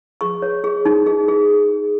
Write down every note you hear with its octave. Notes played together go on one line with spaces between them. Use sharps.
G#4 C#6
C#5
G#4
D#4
G#4
G#4